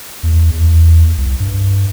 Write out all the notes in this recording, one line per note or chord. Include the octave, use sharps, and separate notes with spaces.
E2
E2
C2
G2